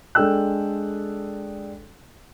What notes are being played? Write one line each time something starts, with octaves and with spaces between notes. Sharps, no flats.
G#3 D4 A4 G5 E6 F#6